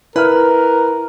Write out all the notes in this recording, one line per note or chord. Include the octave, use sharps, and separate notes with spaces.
E4 A#4 B4 F6